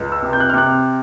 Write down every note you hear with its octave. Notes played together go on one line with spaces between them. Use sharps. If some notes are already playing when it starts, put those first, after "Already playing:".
Already playing: C#2
E6
C3
G6
F#6
F6
C3 F#6